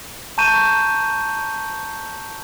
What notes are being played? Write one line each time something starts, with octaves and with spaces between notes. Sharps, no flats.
A5 A#5 C#6 G6 D#7 E7